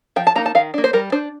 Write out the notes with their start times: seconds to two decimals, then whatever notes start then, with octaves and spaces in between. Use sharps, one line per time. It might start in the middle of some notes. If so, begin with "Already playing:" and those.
0.16 F3 G5
0.27 A5
0.36 A#3 D#4 A#5
0.46 A5
0.55 D#3 F5
0.74 A#3 D4
0.84 C5
0.93 G3 A#4
1.12 D4 C5